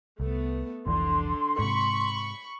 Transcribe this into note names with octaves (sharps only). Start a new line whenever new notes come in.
C2 A3 B3
F1 C2 D3 E3 C6
G#2 C3 B5 C#6